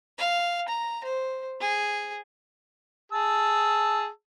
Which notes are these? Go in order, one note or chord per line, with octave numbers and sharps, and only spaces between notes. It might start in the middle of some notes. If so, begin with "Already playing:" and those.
F5
A#5
C5
G#4
G#4 A5 E6